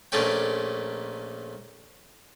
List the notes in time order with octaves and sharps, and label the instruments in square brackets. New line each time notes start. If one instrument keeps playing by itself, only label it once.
[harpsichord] A#1 A#2 A3 C#4 G5